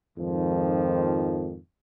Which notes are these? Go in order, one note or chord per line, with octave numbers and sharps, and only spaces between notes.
F2 G#2 D#3 F3